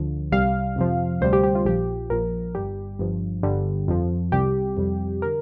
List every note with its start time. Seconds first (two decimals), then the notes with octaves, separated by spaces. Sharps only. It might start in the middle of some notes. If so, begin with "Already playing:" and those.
Already playing: D2 D3 F3
0.32 C2 C3 G3 F5
0.76 F2 C3 F3
1.21 D2 C3 G3 C5
1.33 G4
1.44 G4
1.55 F4
1.65 A#1 A#2 F3 G4
2.10 A#1 A#2 F3 A#4
2.55 G1 G2 G3 G4
2.99 G1 G2 F3
3.43 G1 G2 D3 G3
3.88 F2 F3
4.32 C2 C3 G3 G4
4.77 F2 C3 G3
5.22 D3 A#4